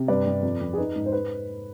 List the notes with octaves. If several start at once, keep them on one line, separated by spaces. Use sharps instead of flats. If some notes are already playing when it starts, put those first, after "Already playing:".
Already playing: C3
G2 B4 D5
G2
F2
F2
G#4
D#4 B4
G#2
C5
B4